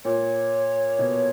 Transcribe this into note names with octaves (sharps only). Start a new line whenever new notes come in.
A#2 C#5
B2